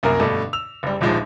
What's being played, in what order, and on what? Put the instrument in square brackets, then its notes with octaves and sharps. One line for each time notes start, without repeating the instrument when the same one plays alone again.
[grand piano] C2 F#2 A#3 A#4
G2 B2 D3 A3
E6 F7
F#1 G3
D#1 A#1 F3 G#3 D#4